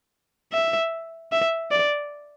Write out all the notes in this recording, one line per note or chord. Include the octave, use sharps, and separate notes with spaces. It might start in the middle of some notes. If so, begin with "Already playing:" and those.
E5
E5
D5